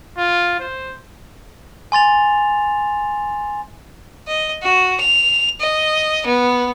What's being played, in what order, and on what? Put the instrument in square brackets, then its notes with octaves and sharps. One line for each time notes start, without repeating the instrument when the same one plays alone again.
[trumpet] F4
C5
[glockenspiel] G#5 C6 A6 F7
[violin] D#5
F#4
F7
D#5
B3